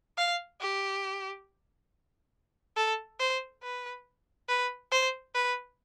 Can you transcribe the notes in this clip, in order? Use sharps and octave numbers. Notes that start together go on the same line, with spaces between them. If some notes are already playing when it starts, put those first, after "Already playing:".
F5
G4
A4
C5
B4
B4
C5
B4